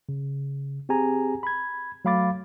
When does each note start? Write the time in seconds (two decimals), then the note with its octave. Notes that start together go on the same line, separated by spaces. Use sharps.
0.09 C#3
0.89 C4 G4 G#4 G#5 A#5
1.43 B5 G#6
2.05 F#3 A3 F5 B5 D6 A6